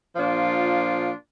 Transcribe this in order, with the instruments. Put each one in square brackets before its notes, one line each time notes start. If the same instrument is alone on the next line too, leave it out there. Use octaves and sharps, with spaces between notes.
[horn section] A#2 F3 D4 F4